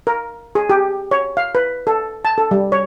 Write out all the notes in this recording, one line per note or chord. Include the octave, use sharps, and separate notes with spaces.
A#4
G#4
G4
C#5
F5
B4
A4
A5
A4
G3
C#5